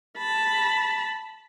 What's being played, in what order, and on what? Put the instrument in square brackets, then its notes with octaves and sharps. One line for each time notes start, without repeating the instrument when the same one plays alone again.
[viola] A5 B5